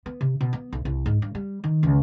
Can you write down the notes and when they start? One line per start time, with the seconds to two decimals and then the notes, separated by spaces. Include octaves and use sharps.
0.06 B3
0.21 C3
0.41 B2
0.53 B3
0.73 B1
0.85 C2
1.06 G#2
1.22 G2
1.35 G3
1.64 D#3
1.83 C#2